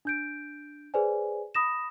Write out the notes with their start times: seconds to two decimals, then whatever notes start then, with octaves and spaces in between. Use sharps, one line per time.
0.05 D4 G6 D7
0.94 G#4 B4 C5 D5 G#5
1.55 B5 D#6 A#6 E7